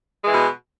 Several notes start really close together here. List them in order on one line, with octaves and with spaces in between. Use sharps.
G#3 E3 B2